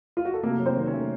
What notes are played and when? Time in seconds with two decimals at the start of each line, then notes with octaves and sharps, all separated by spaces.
0.17 F4
0.25 F#4
0.34 A4
0.43 C3 A#3 A#4
0.59 F#3
0.66 C4 C5
0.76 D#3
0.87 C#4 C#5
0.94 A3